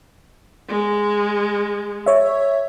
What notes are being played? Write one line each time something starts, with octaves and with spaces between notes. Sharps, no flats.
G#3
C#5 E5